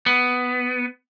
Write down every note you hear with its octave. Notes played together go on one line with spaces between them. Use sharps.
B3